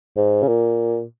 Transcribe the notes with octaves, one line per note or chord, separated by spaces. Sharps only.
G#2
C#3
A#2